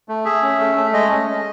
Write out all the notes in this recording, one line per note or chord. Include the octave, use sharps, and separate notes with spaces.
A3
G#4 E5
C#4
A3
A3
G#3 D#5
C#4
G#3